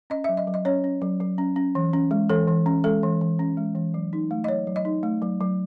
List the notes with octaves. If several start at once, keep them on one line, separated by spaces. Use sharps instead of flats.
C#4 D#5
F#3 E5
D#5
F#3
D#5
C#4 C#5
C#4
F#3
F#3
C#4
C#4
E3
C#4
G#3
E3 A4
E3
C#4
G#3 A4
E3
E3
C#4
G#3
E3
F#3
D#4
A3
D#5
F#3 C#5
F#3
D#5
D#4
A3
F#3
F#3